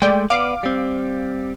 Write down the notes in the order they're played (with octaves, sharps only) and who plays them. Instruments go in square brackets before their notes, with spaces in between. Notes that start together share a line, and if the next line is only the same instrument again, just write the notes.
[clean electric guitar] G#3 A3 [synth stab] D5 G5
[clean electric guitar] B3 D5 [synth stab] F5 D6
[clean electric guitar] G3 C4